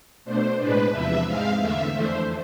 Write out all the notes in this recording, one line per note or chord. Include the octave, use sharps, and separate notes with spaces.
B2 A3 D4 C5
A2 G#3 D4 B4
E2 C3 F3 E5
G#2 G#3 C4 F5
E2 D3 A3 E5
F2 E3 A3 D4 C5